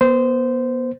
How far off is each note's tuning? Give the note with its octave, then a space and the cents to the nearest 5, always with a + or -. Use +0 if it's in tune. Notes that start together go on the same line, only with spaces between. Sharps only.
B3 -35 C5 -15